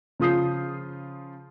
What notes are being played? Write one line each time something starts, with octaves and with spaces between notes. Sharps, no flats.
C#3 F3 F4 D#6 G6 C7